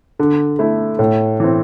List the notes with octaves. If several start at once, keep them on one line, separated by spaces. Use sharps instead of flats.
D3
A3 E4
A2
E3 C4